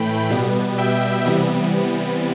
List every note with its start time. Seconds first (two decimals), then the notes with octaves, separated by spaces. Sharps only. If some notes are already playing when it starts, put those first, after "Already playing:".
Already playing: A2 E3 A3 G5 B5
0.30 B2 G3 B3
0.78 E5 G5
1.26 C3 E3 G3 B3